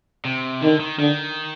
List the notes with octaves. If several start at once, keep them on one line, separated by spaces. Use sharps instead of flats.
C3
D3 D#3
D#3
D3 D#3